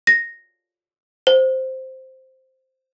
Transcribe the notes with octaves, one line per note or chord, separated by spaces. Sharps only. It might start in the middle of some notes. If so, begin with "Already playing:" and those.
A#6
C5